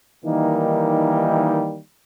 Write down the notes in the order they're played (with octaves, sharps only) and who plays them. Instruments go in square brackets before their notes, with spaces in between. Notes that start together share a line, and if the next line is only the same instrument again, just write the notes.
[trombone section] D#3 E3 G3 A#3 D#4